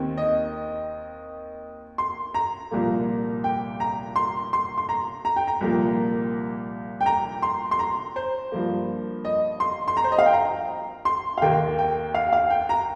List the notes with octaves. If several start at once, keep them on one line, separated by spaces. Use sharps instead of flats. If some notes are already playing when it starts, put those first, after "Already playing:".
Already playing: D#2 D#3 C4
D#5
C6
A#5
C2 A#2 F3 A#3
G5
A#5
C6
C6
C6
A#5
A#5
G5
A#5
C2 A#2 F3 A#3
G5
A#5
C6
C6
A#5
C5
G2 F3 A#3
D#5
C6
C6
A#5
C5
D#5
F5
G5
A#5
C6
F5
D#2 D#3 A#3 G5
G5
F5
F5
G5
A#5